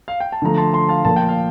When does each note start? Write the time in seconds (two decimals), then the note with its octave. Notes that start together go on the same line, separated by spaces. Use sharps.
0.08 F5
0.20 G5
0.32 A5
0.42 D3 F3 A3 A#5
0.58 A5 C6
0.73 A5 C6
0.88 F5 A5
1.05 A#2 F3 A#3 A5
1.16 G5
1.29 F5